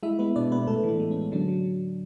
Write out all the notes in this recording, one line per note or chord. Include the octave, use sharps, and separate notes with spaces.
G#3 E4 E5
G#3 B3 B4
B2 D4 D5
B2 B3 B4
A2 A3 A4
E3
B3
G#3
A2 C#4
D3 F#3 D4
F#3